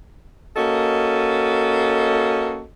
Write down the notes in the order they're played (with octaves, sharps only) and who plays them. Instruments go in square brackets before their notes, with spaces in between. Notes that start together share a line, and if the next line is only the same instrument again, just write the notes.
[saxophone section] A#3 C#4 F#4 A4 D#5